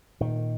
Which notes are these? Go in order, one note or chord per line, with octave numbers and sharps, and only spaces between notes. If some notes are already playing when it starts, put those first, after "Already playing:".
A#2 D#3